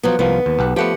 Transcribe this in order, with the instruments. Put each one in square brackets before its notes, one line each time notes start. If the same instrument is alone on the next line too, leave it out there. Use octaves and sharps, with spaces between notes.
[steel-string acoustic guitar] F3 F#3 B3
[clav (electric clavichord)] C2 F3 A#3 [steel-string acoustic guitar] B3
[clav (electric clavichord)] D#2
B1 G4 F#5
[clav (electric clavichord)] F3 A3 B3 [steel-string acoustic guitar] G4 F#5